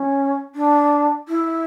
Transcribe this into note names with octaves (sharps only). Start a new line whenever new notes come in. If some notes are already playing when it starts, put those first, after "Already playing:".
Already playing: C#4
D4
E4